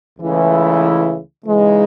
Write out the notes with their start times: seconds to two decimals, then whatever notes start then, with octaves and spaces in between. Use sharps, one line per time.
0.18 C#2 C#3 E3 A3 E4
1.44 C#3 E3 G#3 D#4